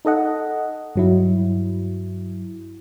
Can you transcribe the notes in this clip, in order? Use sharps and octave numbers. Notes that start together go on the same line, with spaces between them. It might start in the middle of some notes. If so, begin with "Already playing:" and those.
D#4 A4 D#5 F#5
G2 F#3 E4